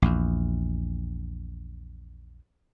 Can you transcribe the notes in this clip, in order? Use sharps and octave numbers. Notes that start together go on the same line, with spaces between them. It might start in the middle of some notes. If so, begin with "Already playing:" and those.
A#1 E2